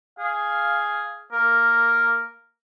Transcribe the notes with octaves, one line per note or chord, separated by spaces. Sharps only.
G#4 F5
A#3 A#4